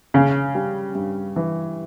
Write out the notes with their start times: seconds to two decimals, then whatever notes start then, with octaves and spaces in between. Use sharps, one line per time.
0.14 C#3 C#4
0.55 G3
0.95 G2
1.36 E3